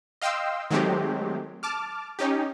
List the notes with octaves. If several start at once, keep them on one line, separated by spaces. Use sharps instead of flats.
D#5 F5 G5 C6 E6
D#3 F#3 G#3 A3 C4 G4
A5 D6 F6
C#4 D#4 G4